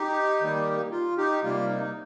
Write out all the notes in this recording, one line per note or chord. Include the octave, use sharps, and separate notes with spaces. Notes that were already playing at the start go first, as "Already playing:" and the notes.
Already playing: D#4 G4
D#3 G3 A#3
F4
D#4 G4
C3 G3 A#3 F4
D#4